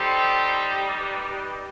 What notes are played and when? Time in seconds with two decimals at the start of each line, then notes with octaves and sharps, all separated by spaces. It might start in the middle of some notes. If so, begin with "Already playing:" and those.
Already playing: G3 D#4 G4 A4 C5
0.99 G4 B4
1.29 G4 B4